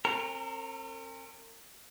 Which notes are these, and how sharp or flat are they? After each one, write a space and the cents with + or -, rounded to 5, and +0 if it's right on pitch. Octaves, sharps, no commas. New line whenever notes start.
C4 +40 A#4 -40 A#5 -5